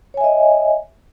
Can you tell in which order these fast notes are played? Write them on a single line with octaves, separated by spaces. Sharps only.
C#5 G#5 E5 D#5